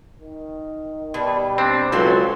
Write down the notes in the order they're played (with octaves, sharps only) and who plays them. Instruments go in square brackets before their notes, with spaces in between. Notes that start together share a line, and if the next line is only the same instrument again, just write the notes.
[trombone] D#3
[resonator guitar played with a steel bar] B2 [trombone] G3
[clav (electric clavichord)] C4 D4
[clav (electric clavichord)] C#2 [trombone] C#3 [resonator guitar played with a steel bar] F#3 C4 A4